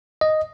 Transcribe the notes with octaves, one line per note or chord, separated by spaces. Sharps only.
D#5